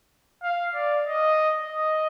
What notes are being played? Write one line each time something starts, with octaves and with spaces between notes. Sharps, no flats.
F5
D5
D#5
D#5